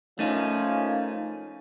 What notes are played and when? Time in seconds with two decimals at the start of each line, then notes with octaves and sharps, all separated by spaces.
0.19 F3 A3 A#3 C#4 D#4